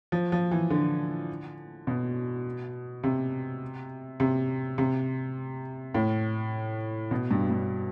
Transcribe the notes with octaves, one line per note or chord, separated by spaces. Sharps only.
F3
F3
E3
D3
B2
C3
C3
C3
A2
B2
G2
G2